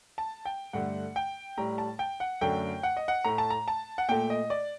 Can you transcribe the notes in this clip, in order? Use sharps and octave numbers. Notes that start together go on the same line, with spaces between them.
A5
G5
G2 D3 A3 F#5
G5
A2 G3 A#5
A5
G5
F#5
F#2 D3 A3 G5
F#5
D#5
F#5
A2 A3 A#5
A5
A#5
A5
F#5
A#2 A3 G5
D#5
D5